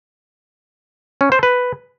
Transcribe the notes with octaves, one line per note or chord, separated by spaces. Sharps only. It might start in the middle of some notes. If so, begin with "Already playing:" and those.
C#4
C5
B4